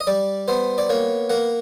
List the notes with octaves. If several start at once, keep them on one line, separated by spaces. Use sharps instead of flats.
D#5
G3 D5
B3 C5
D5
A#3 C#5
A#3 F#5